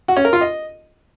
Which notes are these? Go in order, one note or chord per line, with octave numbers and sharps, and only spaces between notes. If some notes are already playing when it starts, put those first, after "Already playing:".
F#4
C#4
A#4
F4
D#5